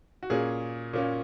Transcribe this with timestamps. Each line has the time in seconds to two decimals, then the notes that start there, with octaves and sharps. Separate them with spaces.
0.23 F#4
0.30 A#2 A#3 C#4 G#4
0.93 A#2 A#3 C#4